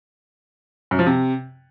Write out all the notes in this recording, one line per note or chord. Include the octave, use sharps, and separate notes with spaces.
F#2
F3
C3